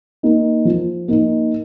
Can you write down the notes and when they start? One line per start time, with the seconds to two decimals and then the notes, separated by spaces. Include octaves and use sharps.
0.23 A#3 D#4
0.65 F3
1.08 A#3 D#4